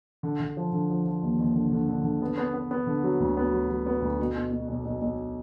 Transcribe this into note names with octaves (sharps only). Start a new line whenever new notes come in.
D3
D3
F3
D3
F3
F3
D#2
D#2
D3
D3
D3
D3
B3
B3
B3
B3
D3
F#3
D2
B3
F#3
F#3
B3
D2
B2
B2
B2
B1
B1
B1